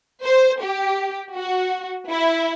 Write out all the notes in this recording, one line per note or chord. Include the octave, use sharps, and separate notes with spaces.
C5
G4
F#4
E4